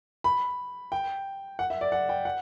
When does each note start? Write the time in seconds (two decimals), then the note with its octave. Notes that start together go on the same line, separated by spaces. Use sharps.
0.24 B5
0.92 G5
1.59 F#5
1.70 E5
1.81 D5
1.92 F#5
2.09 G5
2.25 F#5